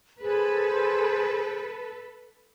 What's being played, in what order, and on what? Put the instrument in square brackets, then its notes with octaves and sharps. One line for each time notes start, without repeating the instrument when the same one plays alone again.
[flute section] G#4 C5 [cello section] A4 B4